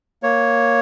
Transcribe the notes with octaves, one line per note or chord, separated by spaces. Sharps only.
A#3 C#5